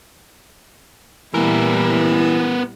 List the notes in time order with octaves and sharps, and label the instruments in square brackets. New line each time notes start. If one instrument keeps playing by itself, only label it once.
[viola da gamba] A#2 G3 E4 [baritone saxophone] E3 [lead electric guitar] B3 A#4